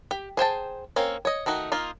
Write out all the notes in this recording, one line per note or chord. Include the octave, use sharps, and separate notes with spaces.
G4
G#4 C5 G5 A5
A#3 C4 C#4
C#5 D#5
D#3 A3 D#4 F#4
A#3 D#4 F4